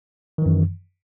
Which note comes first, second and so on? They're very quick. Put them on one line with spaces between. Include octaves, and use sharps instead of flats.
D#3 E3 F#2